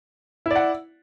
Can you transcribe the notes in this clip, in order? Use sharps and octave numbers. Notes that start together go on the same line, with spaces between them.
E4 D5 F#5